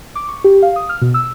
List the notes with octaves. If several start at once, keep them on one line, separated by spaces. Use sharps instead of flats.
D6
C#6
G4
F5
D#6
F6
B2
E6